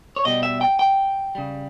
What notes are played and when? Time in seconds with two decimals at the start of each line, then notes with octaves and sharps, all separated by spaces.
0.16 C#5
0.25 B2 G3 D#5
0.43 E5
0.61 G5
0.79 G5
1.35 C#3 G3